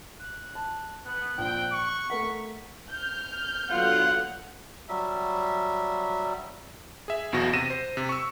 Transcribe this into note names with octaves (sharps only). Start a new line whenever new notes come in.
F#6
A5
B3 F#6
A#1 C4 G5
C#6
A3 A#4 F#5 B6
F6 G6
D3 F#3 B3 F4 F#5
F#3 G3 E5
G#4 E5
B1 E2 B2 F#4 A#6
C3 A#6 D#7 E7
C5
C3
C#6 E6